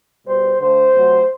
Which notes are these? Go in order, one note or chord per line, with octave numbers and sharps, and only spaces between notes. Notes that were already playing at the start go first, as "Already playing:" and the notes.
B2 G3 C5
D3 A3 C5
C3 F#3 A3